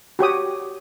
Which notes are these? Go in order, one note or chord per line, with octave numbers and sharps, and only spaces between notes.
F#4 G4 C#5 D#6